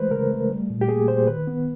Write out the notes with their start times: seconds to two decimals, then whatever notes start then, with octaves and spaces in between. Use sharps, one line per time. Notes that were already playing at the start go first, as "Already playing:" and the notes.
Already playing: E3 G#3 A3 B4 C5
0.11 C#3 A#4
0.31 A3
0.50 G3
0.70 A#2
0.81 G4
0.89 A#3 G#4
1.08 A#2 C5
1.27 D#3 B4
1.47 B3